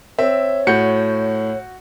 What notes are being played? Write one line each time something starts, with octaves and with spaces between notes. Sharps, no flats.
C4 C#5 E5
A2 F#4 G6 C#7